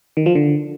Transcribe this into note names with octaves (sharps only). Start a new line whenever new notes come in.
D#3
F3
D3